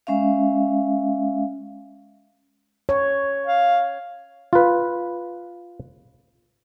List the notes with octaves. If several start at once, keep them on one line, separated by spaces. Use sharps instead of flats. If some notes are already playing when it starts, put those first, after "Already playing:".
G#3 C#4 E5 F5
C#5
F5
F4 B4